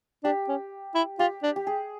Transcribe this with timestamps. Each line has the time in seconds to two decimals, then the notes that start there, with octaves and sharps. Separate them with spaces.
0.24 D4 G4
0.48 C#4
0.95 E4
1.19 F4 G4
1.43 D4
1.56 G4
1.67 G#4